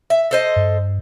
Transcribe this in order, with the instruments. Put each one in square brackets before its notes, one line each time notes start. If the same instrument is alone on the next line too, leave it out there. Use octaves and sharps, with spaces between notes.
[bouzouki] E5
A4 C5 D#5
[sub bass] G2